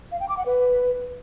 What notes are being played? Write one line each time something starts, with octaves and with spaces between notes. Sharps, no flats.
F5
G5
D6
F#5
B4